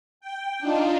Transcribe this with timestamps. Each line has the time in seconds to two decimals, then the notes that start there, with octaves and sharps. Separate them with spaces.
0.21 G5
0.59 D4 D#4 F4